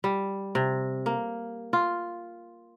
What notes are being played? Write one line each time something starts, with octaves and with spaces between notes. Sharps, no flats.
G3
C3
A#3
F4